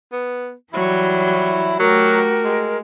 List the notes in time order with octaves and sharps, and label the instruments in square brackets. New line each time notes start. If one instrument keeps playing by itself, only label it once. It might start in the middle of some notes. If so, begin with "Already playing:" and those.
[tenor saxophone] B3
[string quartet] E3 F#3 G3 [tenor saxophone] E4
[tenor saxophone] F#3 [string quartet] A3 F#4 G4 [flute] A#4
[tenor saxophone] G#3